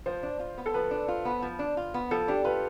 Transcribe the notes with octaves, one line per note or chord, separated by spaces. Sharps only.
F3 C5
D4
F4
B3
A4
F3 B4
D4
F4
B3
F3
D4
F4
B3
F3 A4
D4 G4
F4 B4